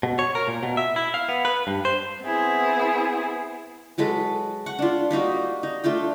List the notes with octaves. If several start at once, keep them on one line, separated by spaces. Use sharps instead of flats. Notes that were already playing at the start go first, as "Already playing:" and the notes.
B2
C#5
A#4
A#2
B2
E5
E4
F5
B3
B4
G2
C5
B3 C4 E4 G#4
F#3 G#3 A4 B4
F#5 C#6
D4 F4
G3 A#3 D#4 F#4
D#4
A3 D4 F4 G5